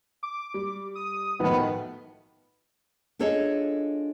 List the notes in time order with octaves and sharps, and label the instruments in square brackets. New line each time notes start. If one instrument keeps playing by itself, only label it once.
[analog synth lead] D6
[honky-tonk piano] G3
[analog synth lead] D#6
[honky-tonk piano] B1 A2 F3 [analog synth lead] D#3 [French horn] B3
[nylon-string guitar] D4 F4 G#4 A4 C#5 D#5